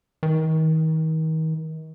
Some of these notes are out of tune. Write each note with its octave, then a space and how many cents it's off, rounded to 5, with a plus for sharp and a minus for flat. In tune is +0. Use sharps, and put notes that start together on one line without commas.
D#3 +35